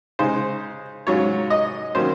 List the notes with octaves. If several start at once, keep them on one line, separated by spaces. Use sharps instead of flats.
C#3 G#3 D#4 C5
G#2 F#3 C#4 F4 C#5
D#5
D#3 F#3 A#3 C#4 C5